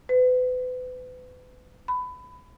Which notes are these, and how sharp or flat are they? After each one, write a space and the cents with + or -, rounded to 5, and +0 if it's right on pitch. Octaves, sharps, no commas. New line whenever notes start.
B4 +35
B5 +20